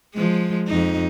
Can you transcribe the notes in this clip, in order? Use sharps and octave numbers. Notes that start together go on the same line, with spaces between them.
F3 G#3
F2 D#4